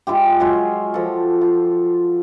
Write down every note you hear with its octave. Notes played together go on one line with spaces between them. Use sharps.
G#3 E4 F4 G4
F#3 G#3 F4
F3 A4
F4